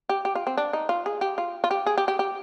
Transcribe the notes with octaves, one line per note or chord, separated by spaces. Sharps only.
G4
G4
F4
C4
D4
D#4
F4
G#4
G4
F4
F4
G4
G#4
G4
G4
G4